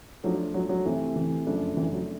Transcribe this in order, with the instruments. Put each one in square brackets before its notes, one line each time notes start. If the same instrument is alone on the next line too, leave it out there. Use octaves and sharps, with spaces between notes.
[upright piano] F3 A3 D4 [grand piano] F#3
[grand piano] F#3
F#3
[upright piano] C3 E3 A3 C4
[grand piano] E3
[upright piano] F#2 C#3 F3 A3 D4
[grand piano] E3
F#3